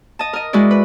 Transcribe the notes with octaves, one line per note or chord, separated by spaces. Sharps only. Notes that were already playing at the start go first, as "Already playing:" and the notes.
D#5 A5
A#4 D#5
G#3 E4 F#4 D5
B4